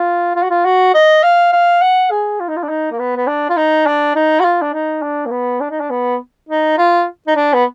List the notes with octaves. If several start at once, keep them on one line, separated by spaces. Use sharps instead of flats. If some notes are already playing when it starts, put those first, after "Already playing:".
Already playing: F4
F4
F#4
F4
F#4
D#5
F5
F5
F#5
G#4
F4
D#4
F4
D4
D#4
A#3
B3
B3
D4
F4
D#4
D4
D#4
F#4
F4
D4
D#4
D4
A#3
B3
D4
D#4
D4
B3
D#4
F4
D#4
D4
B3